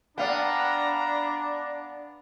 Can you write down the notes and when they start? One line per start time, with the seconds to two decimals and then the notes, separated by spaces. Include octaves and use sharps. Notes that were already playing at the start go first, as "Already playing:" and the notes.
0.18 B3 D4 D5 F5 G5 A#5